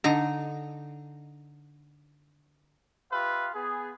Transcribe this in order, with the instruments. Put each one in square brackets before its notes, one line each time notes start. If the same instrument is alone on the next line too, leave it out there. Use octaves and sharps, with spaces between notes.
[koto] D3 D#4 A#5
[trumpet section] F4 G4 B4 E5 F5
B3 G#4